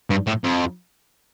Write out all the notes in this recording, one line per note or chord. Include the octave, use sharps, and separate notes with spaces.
G2
A2
F2